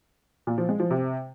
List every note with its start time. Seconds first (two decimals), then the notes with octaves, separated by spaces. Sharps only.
0.47 A#2
0.58 F3
0.69 G#3
0.80 F3
0.90 C3